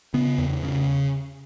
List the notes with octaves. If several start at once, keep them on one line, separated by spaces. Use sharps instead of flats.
C#3 B3
E2
C#3